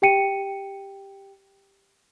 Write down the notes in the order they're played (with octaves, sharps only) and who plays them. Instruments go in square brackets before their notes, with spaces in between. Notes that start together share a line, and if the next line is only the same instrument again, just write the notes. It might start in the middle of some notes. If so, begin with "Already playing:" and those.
[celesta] G4 G5 C#7 D#7